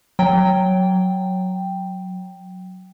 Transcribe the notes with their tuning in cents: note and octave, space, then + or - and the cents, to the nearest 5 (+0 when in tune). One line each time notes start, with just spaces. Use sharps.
F#3 +0 G5 +0